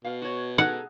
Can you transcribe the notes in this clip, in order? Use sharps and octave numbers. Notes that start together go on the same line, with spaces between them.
B2 F5
F#4 C#5
D#4 G#4 A4 F#5